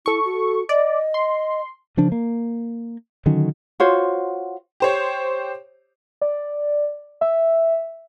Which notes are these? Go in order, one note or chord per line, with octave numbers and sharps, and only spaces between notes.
E4 A4 C#6
F#4
D5 D#5
C6
C#3 F3 D4
A#3
D3 D#3 F#3 C#4
F4 F#4 C5 C#5
G4 C5 C#5
D5
E5